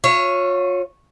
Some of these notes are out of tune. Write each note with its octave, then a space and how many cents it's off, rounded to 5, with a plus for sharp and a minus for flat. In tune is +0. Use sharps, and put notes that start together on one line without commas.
F4 +40 C#5 -10 F5 -45